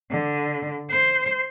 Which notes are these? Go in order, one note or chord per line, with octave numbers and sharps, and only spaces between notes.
D3
C5